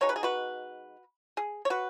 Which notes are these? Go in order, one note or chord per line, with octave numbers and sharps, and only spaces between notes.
B2 G#3 D#4 C#5
B4
G#4
F#4 B4
G#4
C#5
F#4 B4